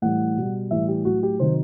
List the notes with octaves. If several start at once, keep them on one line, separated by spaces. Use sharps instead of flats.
A2 E3 G3 F#5
B2 G3
A2 E3 G3 E5
G4
A2 F#3 F#4
G4
C3 D#3 F#3 C5